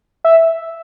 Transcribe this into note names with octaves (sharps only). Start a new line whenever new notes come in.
E5